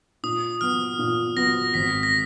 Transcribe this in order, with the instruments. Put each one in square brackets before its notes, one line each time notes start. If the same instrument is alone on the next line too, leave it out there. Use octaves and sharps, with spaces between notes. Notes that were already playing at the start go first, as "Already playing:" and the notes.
[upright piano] A#2 [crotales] D#6
[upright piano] F#3 B3 [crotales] F6
[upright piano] A#2
[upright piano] F#3 B3 [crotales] A#6
[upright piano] G#1 [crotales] B6
[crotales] A#6